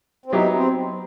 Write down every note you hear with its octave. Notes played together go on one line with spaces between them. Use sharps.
C4
F#3 B3 D#4 E4 G4
C4